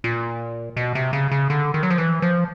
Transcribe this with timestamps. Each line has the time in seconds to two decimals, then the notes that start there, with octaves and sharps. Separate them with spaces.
0.04 A#2
0.77 B2
0.95 C3
1.13 C#3
1.31 C#3
1.50 D3
1.74 D#3
1.83 F#3
1.90 F3
1.98 E3
2.22 F3